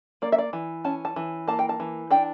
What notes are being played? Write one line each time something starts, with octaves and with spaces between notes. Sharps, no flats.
A#3 D5
E5
D5
E3
C#4 A5
A5
E3
A#3 A5
G5
A5
E3
D4 G5